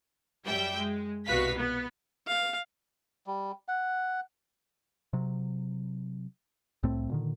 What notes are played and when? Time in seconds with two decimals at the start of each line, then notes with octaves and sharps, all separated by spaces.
0.44 F#2 G3 E5 G5
0.77 G#3
1.25 C2 B2 F#4 B4 F5 B6
1.56 B3
2.27 F5
3.26 G3
3.68 F#5
5.13 C3 F#3
6.83 C2 A2 A3 C4
7.10 A#2 D3 D#3